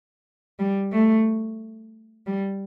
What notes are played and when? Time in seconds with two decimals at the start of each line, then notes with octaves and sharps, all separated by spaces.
0.59 G3
0.92 A3
2.26 G3